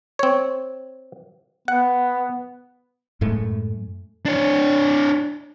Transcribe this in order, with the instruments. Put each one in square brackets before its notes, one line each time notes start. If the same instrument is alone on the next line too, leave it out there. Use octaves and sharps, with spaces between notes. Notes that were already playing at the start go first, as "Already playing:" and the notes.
[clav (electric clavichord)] C4 C#5
[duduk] B3 [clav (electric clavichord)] F#5
[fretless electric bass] F#2 A2 G#3 A3
[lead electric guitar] D4 C#5